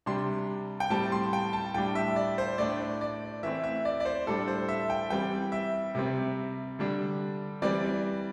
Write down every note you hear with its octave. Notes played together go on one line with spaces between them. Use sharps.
C3 G3 D4 C6
G5
A2 G3 C4 A5
C6
G5
A5
A2 G3 D4 G5
E5
D5
C5
A2 A3 D4 D5
D5
E3 A3 C4 E5
E5
D5
D5
C5
A2 G3 D4 A4
C5
E5
G5
E3 G3 C4 G5
E5
C3 G3 C4
D3 G3 D4
E3 G3 C4 D5